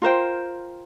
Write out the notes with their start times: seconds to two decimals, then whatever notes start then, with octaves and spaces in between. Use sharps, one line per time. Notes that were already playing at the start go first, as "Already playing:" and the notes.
0.02 F4 A#4 C5 G5